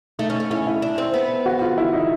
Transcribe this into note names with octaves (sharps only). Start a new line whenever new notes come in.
A3 D#4
C#4
C#4
C#4 E4
E4
D4
C4
B3
F#4
F4
E4
D#4